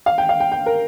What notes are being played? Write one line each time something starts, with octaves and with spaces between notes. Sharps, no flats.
F5
G5
F5
G5
G5
A#4